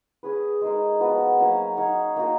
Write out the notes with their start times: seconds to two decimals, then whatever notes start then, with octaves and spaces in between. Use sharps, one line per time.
0.23 C#4 G#4 B4
0.62 G#3 D#4 A#4
1.00 F3 B3 F#4 B4
1.39 F#3 A#3 C#4
1.77 D#4 A#4 C#5 F5
2.16 A#3 D#4 F#4 A#4